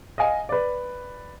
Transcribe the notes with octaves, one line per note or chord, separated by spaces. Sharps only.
D#5 F5 G#5
B4 D5